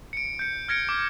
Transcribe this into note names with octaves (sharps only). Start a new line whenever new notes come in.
C#7 D7
G6 C#7
F6 G#6 A#6 C#7 D7
D6